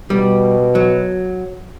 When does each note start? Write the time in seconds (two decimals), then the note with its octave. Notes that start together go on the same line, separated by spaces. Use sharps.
0.10 B2 G3
0.75 F#3